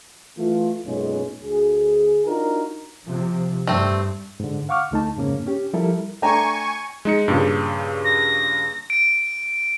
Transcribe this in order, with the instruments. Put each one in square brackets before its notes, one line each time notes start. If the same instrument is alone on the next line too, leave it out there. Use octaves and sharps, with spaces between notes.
[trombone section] E3 A3 F4
B1 F#2 A#2 G#3 C#4
D2 G#4
D4 D#4 F4 F#4 A#4
[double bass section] C3 F3
[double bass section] G2 [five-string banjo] A3 C4
[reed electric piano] G#2 D3
F5 F#5 C#6 D6 F6
D2 D3 A3 D#4 A5
F2 G#2 C#3 A#3 C#4
C#4 G4
F3 G3 E4 A4 A#4 E5
[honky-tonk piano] A3 D4 [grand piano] G5 A#5 [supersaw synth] G#5 C#6
[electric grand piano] G#3 D#4 C#7
G2 A#2 C#3
[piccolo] A#6
[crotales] D7